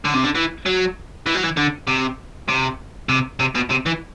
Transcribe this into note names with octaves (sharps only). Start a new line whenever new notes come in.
D3
C3
D3
E3
F#3
E3
F#3
E3
D3
C3
C3
C3
C3
B2
C3
E3